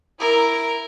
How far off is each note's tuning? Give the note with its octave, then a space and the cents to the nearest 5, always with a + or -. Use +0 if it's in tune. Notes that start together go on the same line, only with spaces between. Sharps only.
E4 +0 A#4 +0